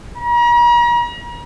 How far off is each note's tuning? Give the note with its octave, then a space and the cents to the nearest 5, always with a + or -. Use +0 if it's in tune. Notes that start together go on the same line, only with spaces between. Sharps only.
A#5 +40